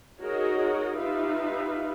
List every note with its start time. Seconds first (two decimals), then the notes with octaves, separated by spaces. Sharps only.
0.22 D#4 F#4 G#4 A#4 C#5 D#5
0.96 D#4 F4 G4 B4 E5 F5